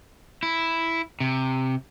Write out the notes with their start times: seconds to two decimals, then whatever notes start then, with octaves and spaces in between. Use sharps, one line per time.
0.43 E4
1.20 C3